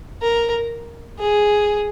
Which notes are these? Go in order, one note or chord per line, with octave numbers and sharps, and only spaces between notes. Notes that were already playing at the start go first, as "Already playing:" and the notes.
A#4
G#4